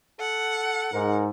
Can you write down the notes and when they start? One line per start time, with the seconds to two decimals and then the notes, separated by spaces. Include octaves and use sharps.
0.20 A4 F#5
0.93 G#2 A#4